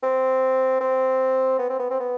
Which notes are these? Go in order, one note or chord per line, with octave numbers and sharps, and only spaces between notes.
C4
C4
B3
C4
B3
C4
B3